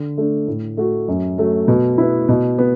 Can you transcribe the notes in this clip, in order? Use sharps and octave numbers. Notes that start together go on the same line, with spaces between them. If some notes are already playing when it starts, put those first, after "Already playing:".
Already playing: D3
A3 D4
A2
A3 F#4
F#2
F#3 A3
B2
B3 E4
B2
B3